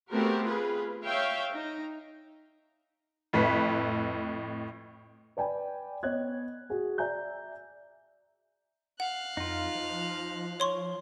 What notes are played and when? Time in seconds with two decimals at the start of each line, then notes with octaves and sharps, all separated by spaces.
0.10 A3 B3 C4 F#4 G4 A#4
0.44 F4 G#4 B4
1.04 C#5 E5 F5 G5
1.51 D#4
3.33 F2 A2 B4 B6
5.37 B4 D5 G5 G#5 B5
6.03 B3 C#5 D#5 F#6 G#6
6.70 F#4 G#4
6.98 D5 E5 G#5 A#5 G6
9.00 F5 F#5 F#6
9.37 F2 D#4 F4
9.75 F3
10.60 C#5 C6 C#6